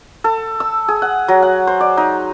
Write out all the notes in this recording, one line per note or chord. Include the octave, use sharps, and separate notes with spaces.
A4
E6
G#4
F#5
F#3
F#5
C5
D5
D#4